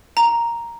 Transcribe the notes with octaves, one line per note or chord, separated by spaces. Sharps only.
A#5